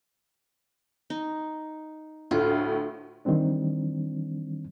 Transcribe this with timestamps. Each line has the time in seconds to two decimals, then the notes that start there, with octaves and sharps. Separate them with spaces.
1.10 D#4
2.31 D2 A2 F4
3.25 D#3 E3 G3 C4 D4